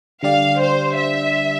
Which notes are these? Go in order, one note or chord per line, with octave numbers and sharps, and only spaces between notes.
D3 G3 D4 G4 D5 F5
C5
E5